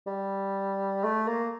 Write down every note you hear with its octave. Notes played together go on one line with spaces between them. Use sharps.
G3
A3
A#3